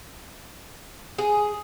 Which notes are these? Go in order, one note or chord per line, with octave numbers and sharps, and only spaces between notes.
G#4